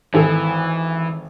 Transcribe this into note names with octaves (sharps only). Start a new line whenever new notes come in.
G#1 E3 G#4 A4